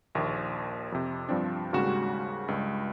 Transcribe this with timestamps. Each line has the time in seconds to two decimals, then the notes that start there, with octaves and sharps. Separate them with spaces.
0.15 A#1 D#2
0.92 F2 C3
1.29 G2 F3 C4 D4
1.73 D#2 G#2 C#3 G3 F#4 E7
2.48 C#2 G2